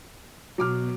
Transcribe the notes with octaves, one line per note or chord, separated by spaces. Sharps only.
B2 F#3 D6 F6